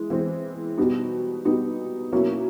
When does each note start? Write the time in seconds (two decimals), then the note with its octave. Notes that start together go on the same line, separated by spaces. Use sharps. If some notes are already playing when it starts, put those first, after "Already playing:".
Already playing: E3 G#3
0.10 E3 G#3 C4
0.78 B2 G3 B3 D#4
1.45 B2 G3 B3 D#4
2.12 B2 F#3 A#3 C#4 E4